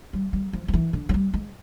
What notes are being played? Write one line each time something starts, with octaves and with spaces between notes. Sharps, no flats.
G3
G3
F3
F3
E3
D3
F#3
G3
G#3